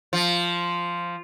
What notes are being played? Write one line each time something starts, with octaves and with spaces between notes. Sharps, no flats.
F3